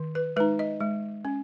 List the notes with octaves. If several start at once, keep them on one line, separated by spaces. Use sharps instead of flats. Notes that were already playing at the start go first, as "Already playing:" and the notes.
Already playing: D#3
B4
G#3 D#4 B4
D#5
G#3
C#4